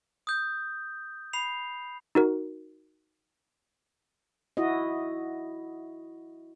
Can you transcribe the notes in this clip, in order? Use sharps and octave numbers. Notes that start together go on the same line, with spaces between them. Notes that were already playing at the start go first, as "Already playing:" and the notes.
D#6 G6
B5 C7 F7
D#4 F#4 A#4
E4 F#4 D#5